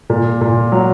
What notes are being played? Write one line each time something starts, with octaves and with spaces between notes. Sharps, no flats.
A#2
A#2
F#3